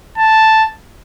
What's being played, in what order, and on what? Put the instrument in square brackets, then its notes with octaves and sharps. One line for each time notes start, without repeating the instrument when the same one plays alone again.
[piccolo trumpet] A5